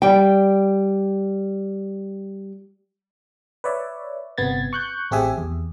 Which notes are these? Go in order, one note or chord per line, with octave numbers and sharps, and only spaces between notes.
G3 G5
B4 C#5 D5 E5
G1 C3 B3 G#6 A6
C#6 F#6 G6
A1 C4 G4 G#4 E5 G#5
E2